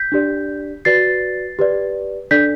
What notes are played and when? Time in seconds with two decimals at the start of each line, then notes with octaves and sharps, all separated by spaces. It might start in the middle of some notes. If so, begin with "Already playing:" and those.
Already playing: G6 B6
0.12 D4 G4 D5
0.85 F#4 B4 D5 A6 C7
1.59 G4 B4 D5
2.31 D4 A4 D5 G6 B6